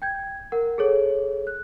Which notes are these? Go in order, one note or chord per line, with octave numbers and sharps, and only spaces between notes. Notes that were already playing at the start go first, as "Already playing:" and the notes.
G5 G6 G#6
A#4 F#5
G#4 A4 C#5
F#6